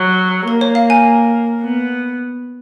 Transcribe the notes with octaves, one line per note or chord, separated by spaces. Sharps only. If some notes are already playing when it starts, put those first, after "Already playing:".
Already playing: F#3
A#3 A#4
C#5
F5
G#5
B3